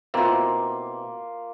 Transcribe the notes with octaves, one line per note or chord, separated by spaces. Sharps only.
B2 A#3 C4 E4 F4